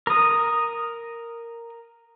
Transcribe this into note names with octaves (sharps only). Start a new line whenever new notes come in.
A#4 D#6